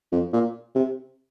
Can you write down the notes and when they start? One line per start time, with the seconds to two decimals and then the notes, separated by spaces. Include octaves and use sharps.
0.13 F2
0.33 A#2
0.76 C3